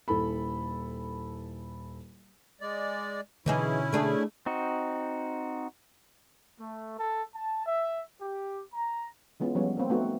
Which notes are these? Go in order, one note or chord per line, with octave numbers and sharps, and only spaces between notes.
D#1 E4 A4 B5
G#3 D5
B2 D3 E3 C#4 D#4 E4 G#4
A3 D4 G#4
C4 D#4 F#4
A3
A4
A5
E5
G4
A#5
E3 G#3 B3 C#4 F4
F3 G3 G#3 B3 C#4 C#5
A#3 C4
A3 B3 C4 D#4 F#4